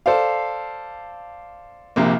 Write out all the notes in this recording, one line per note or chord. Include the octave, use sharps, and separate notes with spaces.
A4 C5 D5 F5
A#1 C3 A#3